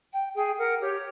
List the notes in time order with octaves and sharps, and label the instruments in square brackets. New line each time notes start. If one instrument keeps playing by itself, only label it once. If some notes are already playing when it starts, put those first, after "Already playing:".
[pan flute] G5
[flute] G#4 [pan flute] G5
[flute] A#4 [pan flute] F#5
[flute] G4 [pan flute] C#5